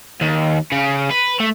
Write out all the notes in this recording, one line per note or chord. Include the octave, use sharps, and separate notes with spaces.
D#2
C#3
B4
A3